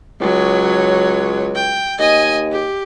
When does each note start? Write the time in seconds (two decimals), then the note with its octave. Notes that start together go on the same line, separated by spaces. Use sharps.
0.21 C#2 F#3 C#5
1.55 G5
1.98 D#2 D#5 G#5
2.52 G4